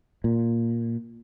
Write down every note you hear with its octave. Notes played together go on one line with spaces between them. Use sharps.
A#2